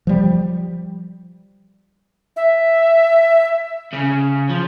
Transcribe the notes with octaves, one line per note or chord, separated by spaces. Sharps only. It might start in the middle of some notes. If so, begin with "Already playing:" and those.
F3 G3
E5
C#3
F3